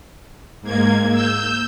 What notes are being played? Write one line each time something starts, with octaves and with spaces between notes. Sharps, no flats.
G#2 A#3 G#6
E6 G6